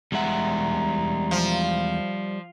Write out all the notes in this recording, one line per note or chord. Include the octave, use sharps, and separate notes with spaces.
E2 G3 G#3 E5 F#5 A#5
F3